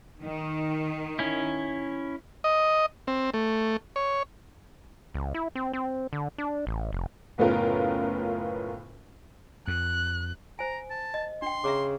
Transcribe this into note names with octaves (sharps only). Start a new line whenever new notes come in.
D#3
C#4 E4
D#5
C4
A3
C#5
C#2
E4
C4
C4
D3
D4
A1
F1
F#1 A2 B3 C#4 F4 A#4
F2 F#6
C5 G#5 A#5
A5
D#5
D4 G5 C6
C#3 E5 A#5 D6